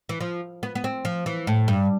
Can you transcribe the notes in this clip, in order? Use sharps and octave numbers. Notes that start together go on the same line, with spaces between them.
E3
F3
B3
B3
C4
F3
E3
A2
G2